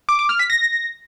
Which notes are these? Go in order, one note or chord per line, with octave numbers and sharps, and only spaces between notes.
D6
D6
F6
B6
A#6